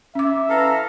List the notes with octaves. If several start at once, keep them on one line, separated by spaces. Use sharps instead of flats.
C#4 E5 D6
E3 A4 F5 A#5